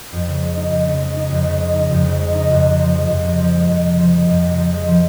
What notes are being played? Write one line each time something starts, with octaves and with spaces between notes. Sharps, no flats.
F2
C#3
G#3
D#4
F2
C#3
G#3
D#4
F2
C#3
G#3
D#4
F2
C#3
G#3
D#4
F2
C3
F3
G#3
F2
C3
F3
G#3
F2
C3
F3
G#3
F2
C3
F3
G#3
F3